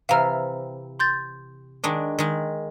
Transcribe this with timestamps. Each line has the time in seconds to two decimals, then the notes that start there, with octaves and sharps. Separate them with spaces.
0.09 C3 E3 F5 A#5 F6
0.99 C6 G6 A6
1.84 D#3 G#3 D4
2.19 D#3 G#3